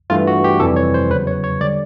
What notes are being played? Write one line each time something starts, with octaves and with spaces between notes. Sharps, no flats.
G2 E3 A3 F4
F#4
G4
F2 C3 E3 G3 A4
C#5
C5
E2 C#3 F#3 B4
C#5
C#5
D3 G3 D5